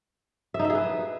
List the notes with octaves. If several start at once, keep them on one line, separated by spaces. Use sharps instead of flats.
E5
D#4
E5
G#4
B4